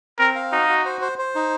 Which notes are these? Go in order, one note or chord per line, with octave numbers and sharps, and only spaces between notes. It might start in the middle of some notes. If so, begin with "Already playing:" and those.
C4 A#4
F5
D#4 F#4
F#4
C5
C5
C5
D#4